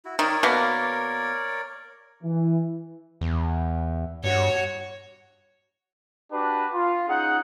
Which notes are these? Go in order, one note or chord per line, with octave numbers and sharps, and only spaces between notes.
E4 F#4
D#3 A#4 C#5 D5
B2 A#3
E3
E2
G2 F#4 C#5
D4 F#4 G4 B4 A5
F4
C#4 D#4 G#4 F#5